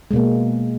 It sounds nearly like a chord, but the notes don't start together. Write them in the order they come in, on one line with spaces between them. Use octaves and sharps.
G#3 B2 A#3